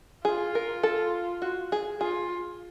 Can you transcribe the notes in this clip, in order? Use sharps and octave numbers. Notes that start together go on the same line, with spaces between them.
F4 G#4
A#4
A4
F#4
G#4
F4 G#4